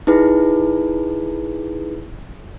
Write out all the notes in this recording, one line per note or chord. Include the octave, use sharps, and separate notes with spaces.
D#4 E4 G#4 B4